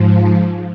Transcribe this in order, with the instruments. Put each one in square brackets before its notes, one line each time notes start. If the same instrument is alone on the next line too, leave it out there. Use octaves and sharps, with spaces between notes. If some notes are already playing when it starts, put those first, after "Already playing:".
Already playing: [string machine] G#2 F3